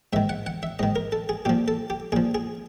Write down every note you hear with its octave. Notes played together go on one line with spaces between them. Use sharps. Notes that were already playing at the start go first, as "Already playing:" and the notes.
G#2 D#3 E5
F#5
F#5
E5
G#2 D#3 D#5
A#4
A4
G#4
A#2 F3 G4
A4
G4
A#2 F3 G#4
G#4